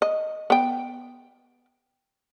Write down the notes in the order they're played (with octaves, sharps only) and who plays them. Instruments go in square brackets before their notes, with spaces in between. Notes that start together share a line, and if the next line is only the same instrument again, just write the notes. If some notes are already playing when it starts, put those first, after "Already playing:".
[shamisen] D#5
B3 G5